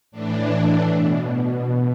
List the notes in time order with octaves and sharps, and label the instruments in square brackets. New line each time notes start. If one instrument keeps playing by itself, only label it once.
[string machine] A2 E3 D4
B2